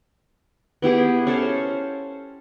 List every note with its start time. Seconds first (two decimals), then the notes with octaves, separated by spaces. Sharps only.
0.82 B3 E4 G4 G#4
1.27 C#4 A4 C5 F5